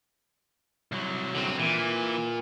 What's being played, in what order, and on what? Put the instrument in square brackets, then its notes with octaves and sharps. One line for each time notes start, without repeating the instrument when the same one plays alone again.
[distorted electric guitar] C2 F#3
[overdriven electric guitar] D3 C4
[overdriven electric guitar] A#2 [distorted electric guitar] E3